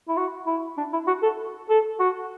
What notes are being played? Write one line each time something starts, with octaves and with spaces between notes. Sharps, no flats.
E4
F#4
E4
D4
E4
F#4
A4
A4
F#4